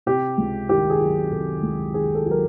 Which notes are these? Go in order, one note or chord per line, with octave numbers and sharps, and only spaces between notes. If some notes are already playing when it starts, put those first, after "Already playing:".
C3 G4
C#2
D#3 G4
G#4
F#3
C3 A4
C#2
D#3 G#4
A4
F#3
A#4